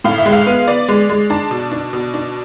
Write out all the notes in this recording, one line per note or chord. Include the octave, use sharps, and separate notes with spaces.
A2 F5
E5
G#3
F5
B3
B3 D5
G#3
G#3
D4 A5
B2
D4
B2
D4